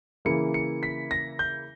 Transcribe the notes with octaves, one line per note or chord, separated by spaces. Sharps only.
C#3 E3 A#3 E4 C#7
C#7
B6
A#6
G6